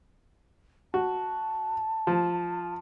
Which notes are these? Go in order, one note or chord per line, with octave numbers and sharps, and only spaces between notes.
F#4 A5
F3